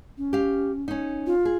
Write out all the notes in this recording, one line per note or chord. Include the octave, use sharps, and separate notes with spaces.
C#4
G4 F5
C#4 D#4
F4
G#4